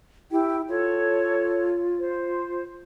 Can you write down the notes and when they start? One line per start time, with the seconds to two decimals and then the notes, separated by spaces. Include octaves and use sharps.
0.31 E4 G4 G5
0.69 F4 A4 C#5
1.98 C5